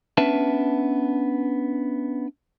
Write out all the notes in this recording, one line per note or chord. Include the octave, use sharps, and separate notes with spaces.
B3 C#4 D4 B4 E5 A5